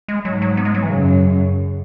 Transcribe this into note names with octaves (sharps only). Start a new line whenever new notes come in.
G#3
G#2 F#3
F#3
B3
G#3
F#3
E3
F#2 C#3